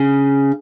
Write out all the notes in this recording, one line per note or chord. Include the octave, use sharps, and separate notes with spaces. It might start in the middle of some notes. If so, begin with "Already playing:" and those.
Already playing: C#3